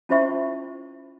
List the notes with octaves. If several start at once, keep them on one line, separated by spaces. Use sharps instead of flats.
C#4 E4 F4 C5 E5 C#6